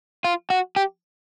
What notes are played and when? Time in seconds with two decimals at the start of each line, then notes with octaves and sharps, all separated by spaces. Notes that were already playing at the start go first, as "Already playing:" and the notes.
0.24 F4
0.50 F#4
0.76 G4